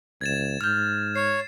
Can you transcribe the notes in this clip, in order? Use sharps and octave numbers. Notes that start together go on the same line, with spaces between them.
C#2 G#6 A6 E7
G#2 F6 G6
C#5 C7